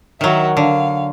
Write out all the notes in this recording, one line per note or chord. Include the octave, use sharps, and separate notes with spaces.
D#3 F#3 F#4 E5
D3 F5